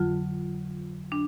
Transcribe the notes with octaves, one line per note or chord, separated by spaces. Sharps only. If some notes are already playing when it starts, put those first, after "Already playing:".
Already playing: F2 D3 F#3 F4
D4